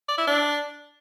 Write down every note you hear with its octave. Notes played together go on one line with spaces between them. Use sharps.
D5
E4
D4